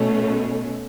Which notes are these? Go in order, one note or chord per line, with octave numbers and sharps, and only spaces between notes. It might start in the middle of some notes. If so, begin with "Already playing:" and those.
Already playing: B2 A3 C#4